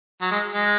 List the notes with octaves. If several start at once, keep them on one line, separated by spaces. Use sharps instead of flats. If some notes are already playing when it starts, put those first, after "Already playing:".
F#3
G#3
G#3